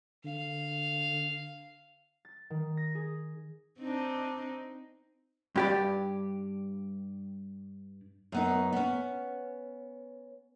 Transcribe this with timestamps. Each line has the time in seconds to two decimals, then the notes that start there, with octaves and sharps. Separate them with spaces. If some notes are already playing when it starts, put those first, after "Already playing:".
0.25 D3 F5
2.25 A6
2.50 D#3
2.77 A#6
2.95 G#4
3.79 C4 D4 D#4
5.56 G2 G4 D5
8.32 F#2 B3 D#4
8.73 B3 C#4